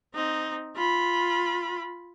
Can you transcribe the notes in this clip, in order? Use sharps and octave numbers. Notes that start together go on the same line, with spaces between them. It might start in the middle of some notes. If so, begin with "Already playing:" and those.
C4 D#4
F4 B5